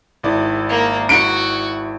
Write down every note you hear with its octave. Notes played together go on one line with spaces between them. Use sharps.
G#1 E4 D5
A#3 A#4
F#4 D7